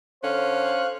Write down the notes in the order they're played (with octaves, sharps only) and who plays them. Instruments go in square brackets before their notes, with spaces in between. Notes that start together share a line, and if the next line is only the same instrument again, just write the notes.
[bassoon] D3 [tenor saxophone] C#4 [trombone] C5 [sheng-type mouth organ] F5 F#6